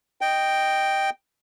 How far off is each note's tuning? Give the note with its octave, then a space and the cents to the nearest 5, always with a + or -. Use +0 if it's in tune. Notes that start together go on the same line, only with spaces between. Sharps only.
D#5 -10 G5 +0